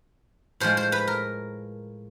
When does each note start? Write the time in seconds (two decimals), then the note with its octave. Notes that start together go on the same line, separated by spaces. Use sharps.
0.60 A2 F3 G#3 C5
0.77 C5
0.92 B4
1.07 A#4